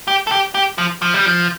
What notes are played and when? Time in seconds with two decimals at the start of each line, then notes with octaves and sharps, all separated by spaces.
0.08 G4
0.27 A4
0.32 G4
0.55 G4
0.78 F3
1.02 F3
1.14 G3
1.26 F3